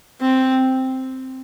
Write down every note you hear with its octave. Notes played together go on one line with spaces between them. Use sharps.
C4